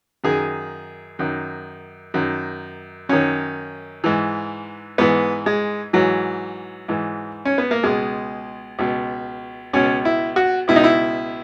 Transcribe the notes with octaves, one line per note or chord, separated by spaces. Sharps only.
F#2 D#3 G#4
F#2 D#3
F#2 D#3
F#2 D#3 C#4
G#2 E3
G#2 E3 B3
G#3
G#2 E3 F#3
G#2 E3
C#4
B3
A#3
C#2 B2 G#3
C#2 B2
C#2 B2 C#4
E4
F#4
C#2 B2 E4
D#4
E4